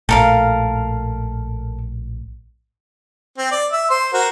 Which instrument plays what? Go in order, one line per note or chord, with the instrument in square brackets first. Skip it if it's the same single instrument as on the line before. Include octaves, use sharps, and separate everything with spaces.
[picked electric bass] A#1 A2 [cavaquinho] A4 A#4 F5
[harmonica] C4
D5
E5
C5 C6
F#4 A#4 C5